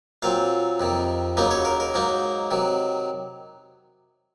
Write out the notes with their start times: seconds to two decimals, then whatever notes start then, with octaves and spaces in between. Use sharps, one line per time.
0.22 A#2 F#3 C4 F5
0.80 F2 C3 D#3
1.37 D#2 C#3 F#3 A#3 D#4 D#5
1.51 C#5
1.65 A#4
1.80 A#4
1.94 G#2 F#3 A#3 D#4
2.51 C3 D#3 F#3